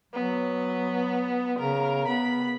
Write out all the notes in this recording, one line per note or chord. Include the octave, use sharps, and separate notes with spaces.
F#3 B3
C#3 A#4
B3 B5